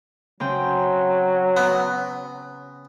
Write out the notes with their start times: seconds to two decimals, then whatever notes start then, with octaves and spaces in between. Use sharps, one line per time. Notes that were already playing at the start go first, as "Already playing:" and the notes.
0.40 C#3 F#3 C4 G5
1.57 B3